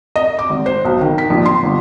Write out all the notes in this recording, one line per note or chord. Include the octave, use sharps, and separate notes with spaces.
D#5
D6
G#1
C5
B1
D#3
B6
A#1
C6
G1